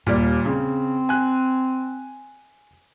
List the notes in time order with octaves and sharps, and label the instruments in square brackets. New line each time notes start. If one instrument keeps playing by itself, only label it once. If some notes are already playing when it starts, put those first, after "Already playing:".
[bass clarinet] D#2 [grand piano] A#2 G3 D5
[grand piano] C#3 [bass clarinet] C4
[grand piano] G#5 F#6